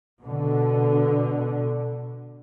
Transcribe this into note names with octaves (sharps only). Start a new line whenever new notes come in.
B2 D3